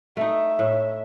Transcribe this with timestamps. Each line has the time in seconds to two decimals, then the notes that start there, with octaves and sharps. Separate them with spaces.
0.17 A3 D#4 E5
0.59 A2